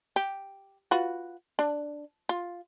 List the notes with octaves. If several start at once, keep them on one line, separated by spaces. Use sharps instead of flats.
G4
F4 F#4 B4
D4
F4